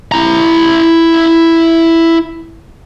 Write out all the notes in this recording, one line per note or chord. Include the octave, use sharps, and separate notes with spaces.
E4 A#5